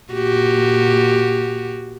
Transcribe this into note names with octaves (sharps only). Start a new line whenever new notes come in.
A#2 F#4 G4